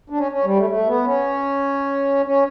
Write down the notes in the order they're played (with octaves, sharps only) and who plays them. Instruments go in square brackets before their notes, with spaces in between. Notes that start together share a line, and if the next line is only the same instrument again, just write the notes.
[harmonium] D4
C#4
C#4
G3
A3
A3
B3
C#4
C#4